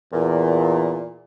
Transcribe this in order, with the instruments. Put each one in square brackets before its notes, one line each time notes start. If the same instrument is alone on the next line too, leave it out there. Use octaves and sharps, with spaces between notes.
[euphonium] E2 [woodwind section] A#2